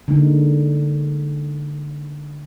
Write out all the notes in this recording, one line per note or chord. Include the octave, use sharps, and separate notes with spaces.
D3 G#3 A#3 D#4